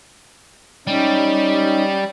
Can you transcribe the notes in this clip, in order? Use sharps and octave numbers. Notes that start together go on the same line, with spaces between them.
G3 C#4 D#4